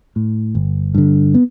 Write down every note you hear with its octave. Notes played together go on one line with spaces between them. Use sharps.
A2
G1
G2 D3
B3